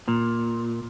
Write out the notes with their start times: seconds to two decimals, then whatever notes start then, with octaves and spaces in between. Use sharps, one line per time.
0.08 A#2